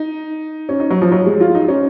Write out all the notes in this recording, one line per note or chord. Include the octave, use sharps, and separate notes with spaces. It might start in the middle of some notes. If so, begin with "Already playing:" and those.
Already playing: D#4
C#4
D#4
F#3
F3
F#3
G#3
F4
D#4
C#4